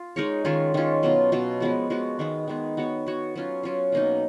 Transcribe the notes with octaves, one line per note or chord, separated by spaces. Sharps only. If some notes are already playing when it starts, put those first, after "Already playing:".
Already playing: F4
G#3 D#4 A#4 C#5
D#3 G#3 C#4 F4
D#3 G#3 C#4 F4
B2 F#3 B3 F4
B2 F#3 B3 F4
F3 G#3 B3 F#4
F3 G#3 B3 F#4
D#3 G#3 B3
D#3 G#3 B3
B3 F#4 C#5
B3 F#4 C#5
F#3 C#4 F4
F#3 C#4 F4
B2 A#3 D#4